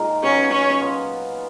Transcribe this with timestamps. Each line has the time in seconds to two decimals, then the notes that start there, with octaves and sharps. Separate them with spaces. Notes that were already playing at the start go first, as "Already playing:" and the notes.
Already playing: A#2 G#3 D#4 A#4
0.23 C#3 F#3 B3 C#4
0.52 C#4
0.81 A#2 F#3 B3 F4